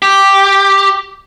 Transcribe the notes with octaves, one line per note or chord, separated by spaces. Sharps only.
G4